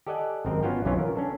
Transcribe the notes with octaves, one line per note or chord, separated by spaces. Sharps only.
G4 A4 D5 D#5 F#5 G#5
G#1 F#2 C4 A#4 D#5
B3 C#4 F4 F#4 F5 G5
B1 F#2 E3 C#4 F4 C#5
A#4
C#4 D4 A4